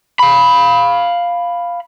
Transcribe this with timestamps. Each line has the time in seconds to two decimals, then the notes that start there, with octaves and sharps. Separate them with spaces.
0.19 F5 B5